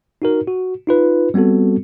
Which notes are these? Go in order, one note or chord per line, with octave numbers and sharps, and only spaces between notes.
D#4 F#4 A#4
F#4
D#4 F4 B4
G3 B3 C4 F#4 A4